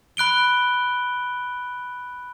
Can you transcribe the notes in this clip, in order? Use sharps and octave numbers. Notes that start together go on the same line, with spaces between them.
B5 F#6 D7 G7